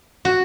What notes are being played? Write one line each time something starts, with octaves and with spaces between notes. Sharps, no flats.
F#4